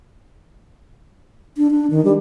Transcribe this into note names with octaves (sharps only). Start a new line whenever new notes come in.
D4
D4
D#3
G3